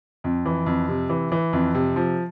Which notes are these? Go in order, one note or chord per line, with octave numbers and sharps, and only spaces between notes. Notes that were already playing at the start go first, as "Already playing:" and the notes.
F2
E3
F2
C3
E3
E3
F2
C3
F3